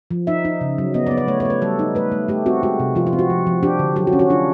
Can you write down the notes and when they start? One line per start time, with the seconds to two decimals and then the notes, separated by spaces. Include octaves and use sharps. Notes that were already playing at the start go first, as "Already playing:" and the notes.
0.11 F3
0.27 D#4 E5
0.45 D#4
0.61 C#3
0.78 F#3
0.94 B3 D#5
1.07 D5
1.11 B3
1.18 D5
1.28 A3 C#5
1.40 C#5
1.45 A3
1.50 B4
1.62 G3 A4
1.79 D#4
1.95 A3 B4
2.12 A3
2.28 A3 G4
2.46 C4 F#4
2.63 G#3 F#4
2.80 C3
2.95 F3 F4
3.07 F4
3.13 C4
3.19 F#4
3.30 F3
3.47 F3
3.63 D4 G4
3.79 D3
3.96 F#3 G4
4.07 F#4
4.13 C#4
4.19 F#4
4.30 D4 F4